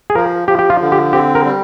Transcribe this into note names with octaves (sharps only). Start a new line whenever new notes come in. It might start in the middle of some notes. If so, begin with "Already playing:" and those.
G#4
F3 A#4
F3 G4
G4
F4
D3
G4
C4 G4
A#4
G3